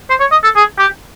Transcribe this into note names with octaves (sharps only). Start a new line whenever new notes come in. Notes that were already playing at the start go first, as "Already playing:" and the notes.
C5
C#5
D#5
A4
G#4
G4